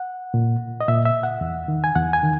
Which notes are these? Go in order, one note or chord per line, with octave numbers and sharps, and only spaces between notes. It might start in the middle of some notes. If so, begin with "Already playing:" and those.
Already playing: F#5
A#2
D#5
A#2 E5
E5
F#5
E2
D#3
G#5
E2 F#5
G#5
D#3